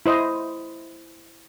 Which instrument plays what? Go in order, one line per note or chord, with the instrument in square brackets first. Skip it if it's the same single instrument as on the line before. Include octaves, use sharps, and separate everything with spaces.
[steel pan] E4 C5 D#5